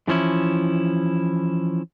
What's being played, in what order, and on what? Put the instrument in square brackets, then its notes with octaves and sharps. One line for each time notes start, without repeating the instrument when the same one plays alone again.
[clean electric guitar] E3 F3 C#4 E4